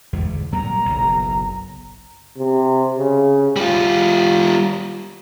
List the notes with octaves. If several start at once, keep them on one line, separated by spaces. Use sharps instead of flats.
E2 G#2 D3
A#2 F#3 G3 A#5
F#1 B1
C3
C#3
G3 F4